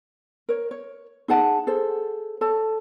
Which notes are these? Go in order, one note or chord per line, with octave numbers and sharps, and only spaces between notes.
A#4 C#5
C#5
D#4 G#4 F#5 A5
G#4 A4 C5
A4 C#5 A5